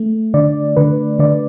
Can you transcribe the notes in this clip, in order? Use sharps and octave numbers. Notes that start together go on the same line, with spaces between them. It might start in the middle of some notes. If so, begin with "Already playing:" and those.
Already playing: A3
D3 D5
D3 B4
D3 D5